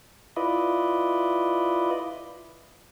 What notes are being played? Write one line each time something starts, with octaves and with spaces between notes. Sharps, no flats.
E4 F4 B4 D5 D#5